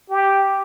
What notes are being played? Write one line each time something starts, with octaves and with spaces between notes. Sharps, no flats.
G4